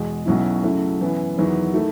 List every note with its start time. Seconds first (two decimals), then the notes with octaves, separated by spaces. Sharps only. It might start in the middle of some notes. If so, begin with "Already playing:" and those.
Already playing: E2 B2 G#3
0.26 B1 B2 F#3 C#4 E4
0.63 F#2 C#3 F#3 A3 E4
1.00 F#2 E3 B3 E4
1.38 E2 D#3 F#3 B3 E4
1.74 D#3 A3 E4